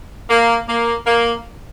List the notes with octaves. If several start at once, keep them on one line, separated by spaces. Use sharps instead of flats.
A#3
A#3
A#3